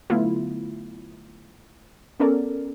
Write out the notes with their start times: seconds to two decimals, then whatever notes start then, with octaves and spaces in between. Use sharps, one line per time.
0.10 D3 F#3 A3 B3 E4 F4
2.20 B3 C#4 A4 A#4 D5